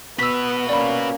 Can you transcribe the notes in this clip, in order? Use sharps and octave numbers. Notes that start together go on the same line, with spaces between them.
B3 F#4 B4 E6 B6
A#3 C#4 D5 B5